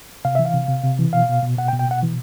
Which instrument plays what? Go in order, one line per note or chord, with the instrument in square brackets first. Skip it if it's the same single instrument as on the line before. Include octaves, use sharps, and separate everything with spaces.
[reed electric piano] C3 F5
E3 E5
F5
C3
C3
C3
E3
B2 F5
B2
B2
B2 F#5
G5
B2
G5
B2 F#5
E3